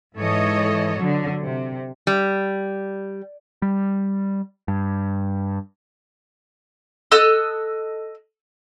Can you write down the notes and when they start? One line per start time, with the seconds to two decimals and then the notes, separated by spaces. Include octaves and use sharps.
0.16 G#2 E3 A4 C#5 D#5
0.99 D3 F#3
1.45 C3
2.07 G3
3.62 G3
4.68 G2
7.12 A4 D#5 E6 F#6